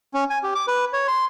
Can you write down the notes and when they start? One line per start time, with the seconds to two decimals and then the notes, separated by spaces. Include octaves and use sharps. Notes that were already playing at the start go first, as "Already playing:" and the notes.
0.14 C#4
0.30 G#5
0.43 G4
0.55 D6
0.68 B4
0.93 C#5
1.08 C6